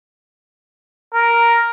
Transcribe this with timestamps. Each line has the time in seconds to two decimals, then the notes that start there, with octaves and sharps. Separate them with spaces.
1.14 A#4